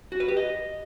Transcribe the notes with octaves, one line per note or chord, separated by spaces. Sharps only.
F#4
B4
G4
D#5